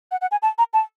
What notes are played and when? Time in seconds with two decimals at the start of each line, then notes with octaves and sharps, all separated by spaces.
0.11 F#5
0.21 F#5
0.31 G#5
0.42 A5
0.58 A#5
0.73 A5